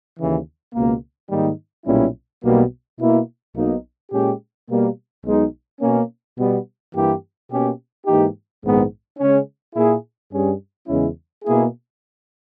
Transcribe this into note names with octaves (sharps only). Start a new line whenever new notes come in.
D#2 C#3 E3
C#2 B2 A#3
G#2 D#3 G3 A#3 D#4
B1 A#2 G3 C#4 E4
B1 B2 G3 A#3
B2 A#3 E4
B1 B2 A#3 D#4
A#2 G#3 C#4 G4
B2 G3 A#3
B1 B2 G#3 D#4
B2 A#3 C#4
B2 G3 B3
G2 E3 A#3 E4 G4
B2 A#3 C#4 G4
G#2 E3 A#3 D#4 G4
A#1 G#2 D#3 G#3 B3
C#3 G#3 C#4
A#2 A#3 E4 G#4
G2 G3 C#4 G#4
E2 C#3 G#3 C#4 E4
B2 A#3 E4 G#4